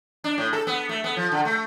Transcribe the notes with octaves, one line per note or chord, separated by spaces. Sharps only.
D4
A2
A4
B3
A3
B3
F3
D3
A3